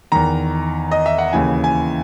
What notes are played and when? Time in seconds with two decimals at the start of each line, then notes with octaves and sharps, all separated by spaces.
0.12 E2 D#3 A#5
0.91 D#5
1.06 E5
1.18 F#5
1.33 D#2 C#3 E3 G#5
1.64 G#5